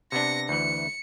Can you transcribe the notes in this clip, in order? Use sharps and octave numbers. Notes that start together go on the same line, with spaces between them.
C3 B3 D4 A#6 C#7
D2 E3 C#7